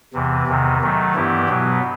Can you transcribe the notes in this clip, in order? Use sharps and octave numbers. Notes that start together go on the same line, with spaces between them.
E2 C3 E3
E2 C3 D#3
D#3 F#3 A3
G2 E3 B3 E4 G4
B2 F#3 B3